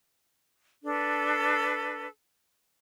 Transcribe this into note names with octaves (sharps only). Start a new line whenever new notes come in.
D4 A4 B4